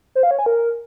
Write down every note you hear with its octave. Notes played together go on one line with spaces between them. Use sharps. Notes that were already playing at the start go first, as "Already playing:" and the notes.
C5
F5
C#5
G#5
A#4